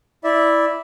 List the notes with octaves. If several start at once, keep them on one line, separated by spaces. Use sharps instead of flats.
E4 D5 E5